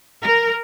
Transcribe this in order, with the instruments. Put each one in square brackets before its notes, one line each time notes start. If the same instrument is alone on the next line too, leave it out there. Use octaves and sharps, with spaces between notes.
[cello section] A#4